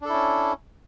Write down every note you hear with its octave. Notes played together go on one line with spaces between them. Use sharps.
C#4 D4 E4 A4